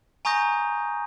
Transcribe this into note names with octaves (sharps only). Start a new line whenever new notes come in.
G#5 A#5 C#6 D#6 G6 A#6